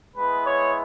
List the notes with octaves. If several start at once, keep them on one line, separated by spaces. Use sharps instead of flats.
G#3 B3 E4 B4
C#5